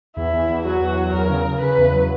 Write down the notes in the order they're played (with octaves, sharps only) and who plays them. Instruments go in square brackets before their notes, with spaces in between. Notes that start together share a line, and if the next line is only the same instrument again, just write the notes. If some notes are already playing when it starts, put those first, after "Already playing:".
[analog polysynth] E2 [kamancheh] E4
[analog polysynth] E2
E2
[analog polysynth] F#3 [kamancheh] F#4
[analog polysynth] E2
F#3
[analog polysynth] E2 [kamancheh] A#4
[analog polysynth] C#3
C#3
[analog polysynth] C#3 [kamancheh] B4
[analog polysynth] E2
F#3